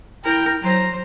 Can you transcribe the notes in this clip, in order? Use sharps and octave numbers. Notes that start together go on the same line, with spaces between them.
E4 A#4 G5
F#3 C5 A#5